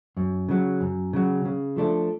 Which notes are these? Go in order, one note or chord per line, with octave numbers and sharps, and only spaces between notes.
F#2
C#3 F#3
F#2
C#3 F#3
C#3
F3 A3 D4